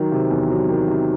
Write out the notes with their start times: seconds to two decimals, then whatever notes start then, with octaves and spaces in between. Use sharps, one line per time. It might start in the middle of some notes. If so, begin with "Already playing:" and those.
Already playing: D#3 F#3
0.12 C3
0.30 E2
0.50 F#3
0.69 D#3
0.88 C3